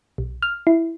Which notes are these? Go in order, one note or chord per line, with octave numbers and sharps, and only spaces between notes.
B1
F6
E4